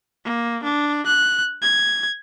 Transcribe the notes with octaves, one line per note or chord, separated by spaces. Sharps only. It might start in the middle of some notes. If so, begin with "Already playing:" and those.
A#3
D4
F#6
G#6